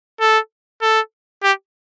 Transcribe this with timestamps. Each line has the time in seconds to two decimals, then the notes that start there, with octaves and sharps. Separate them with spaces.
0.20 A4
0.82 A4
1.43 G4